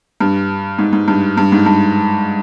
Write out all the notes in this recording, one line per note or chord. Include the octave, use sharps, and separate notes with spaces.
G2
G#2
G#2
G2
G2
G#2
G2